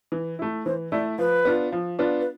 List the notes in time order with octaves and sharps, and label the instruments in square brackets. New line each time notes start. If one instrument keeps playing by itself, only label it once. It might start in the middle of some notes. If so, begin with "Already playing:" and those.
[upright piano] E3
A3 E4
[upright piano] E3 [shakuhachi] C5
[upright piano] A3 E4 [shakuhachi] D5
[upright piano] F3 [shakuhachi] B4
[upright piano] B3 D4 F4
F3
B3 D4 F4
[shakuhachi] B4